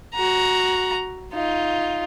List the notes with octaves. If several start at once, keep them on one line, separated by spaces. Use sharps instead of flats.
F#4 A#5
D#4 F4